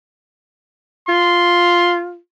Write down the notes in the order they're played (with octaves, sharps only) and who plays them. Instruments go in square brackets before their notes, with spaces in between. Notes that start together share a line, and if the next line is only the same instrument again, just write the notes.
[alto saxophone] F4 [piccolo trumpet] C6